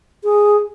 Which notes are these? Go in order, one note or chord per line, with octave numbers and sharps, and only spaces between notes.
G#4